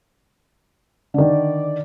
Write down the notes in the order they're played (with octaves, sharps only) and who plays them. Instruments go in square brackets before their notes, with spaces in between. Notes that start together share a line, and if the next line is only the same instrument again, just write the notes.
[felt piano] D3 D#3 [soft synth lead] D5